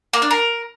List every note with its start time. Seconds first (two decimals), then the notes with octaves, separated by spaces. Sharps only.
0.13 A#3
0.22 D4
0.31 A#4